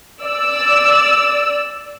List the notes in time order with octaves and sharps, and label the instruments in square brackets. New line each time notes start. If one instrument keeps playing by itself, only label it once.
[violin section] D5 E6